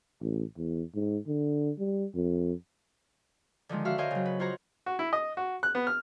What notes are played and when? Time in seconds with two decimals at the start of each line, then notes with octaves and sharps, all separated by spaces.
0.21 A1
0.57 E2
0.94 G#2
1.27 D3
1.78 G3
2.15 F2
3.69 D3 D#3 F3 G#3
3.85 F#4 E5 F5 F6
3.98 A#4 C5 C#5 D#5 F5 G5
4.11 C#3 F#3
4.25 B4
4.39 F4 F#4 C5 C#5 A#5
4.86 F#4
4.99 E4
5.13 D#5
5.37 F#4
5.63 F#6
5.75 B3
5.87 F6